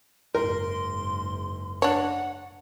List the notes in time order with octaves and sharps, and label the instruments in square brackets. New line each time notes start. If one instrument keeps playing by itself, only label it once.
[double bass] F#1 G#2 [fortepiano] A#4 [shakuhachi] C6
[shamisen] D4 C#5 [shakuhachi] F#5